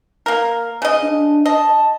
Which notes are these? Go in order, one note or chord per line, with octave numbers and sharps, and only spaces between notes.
A#3 A#4
C#3 D#5
D4
D#5 A5